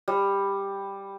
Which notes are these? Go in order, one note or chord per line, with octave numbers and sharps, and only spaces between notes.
G3